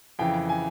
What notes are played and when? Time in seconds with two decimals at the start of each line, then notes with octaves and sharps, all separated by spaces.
0.19 F2 C#3 E3 G5
0.49 G#5